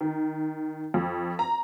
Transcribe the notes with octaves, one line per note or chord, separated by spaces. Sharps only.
D#3
F2
A#5